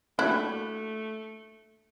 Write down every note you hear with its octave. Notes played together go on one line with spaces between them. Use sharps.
A3 A#3 D4 E4 F#4 F#6